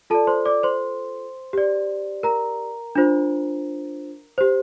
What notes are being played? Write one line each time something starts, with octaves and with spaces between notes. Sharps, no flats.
F4 A4 D5 A5
C5 C6
D5 D6
C5 C6
G4 D5
A#4 A#5
D4 F4 C5
G4 C5